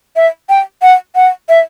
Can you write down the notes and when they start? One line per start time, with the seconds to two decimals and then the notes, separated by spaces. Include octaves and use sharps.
0.16 E5
0.49 G5
0.82 F#5
1.15 F#5
1.49 E5